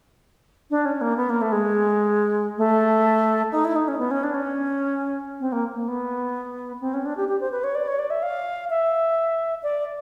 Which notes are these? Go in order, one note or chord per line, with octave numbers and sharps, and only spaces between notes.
D4
C#4
A#3
B3
A#3
A3
G#3
A3
D#4
E4
D#4
C#4
B3
C#4
D4
C#4
C4
A#3
A#3
B3
C4
C#4
D4
G4
G4
C5
B4
C#5
D5
C#5
D5
E5
F5
E5
D5